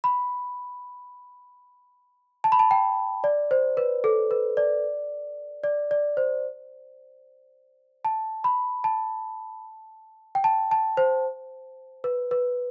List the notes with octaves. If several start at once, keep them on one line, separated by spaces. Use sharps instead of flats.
B5
A5
B5
A5
G5
D5
C5
B4
A4
B4
D5
D5
D5
C5
A5
B5
A5
G5
A5
A5
C5
B4
B4